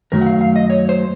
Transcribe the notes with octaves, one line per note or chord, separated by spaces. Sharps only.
F#2 D#3 F#3 A3 A#4
F#5
F5
F5
D#5
C#5
C5